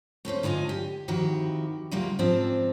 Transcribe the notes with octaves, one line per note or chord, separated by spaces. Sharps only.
A3 C4 C#4 C5
D3 E4 F4 D#5 G#5
G4
F2 D#3 E4 F#4 G4
D2 C#3 G3 A#3 F4 F#5
G#2 C#3 F3 C4 D4